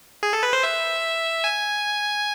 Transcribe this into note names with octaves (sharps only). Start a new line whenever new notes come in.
G#4
A4
B4
C5
E5
G#5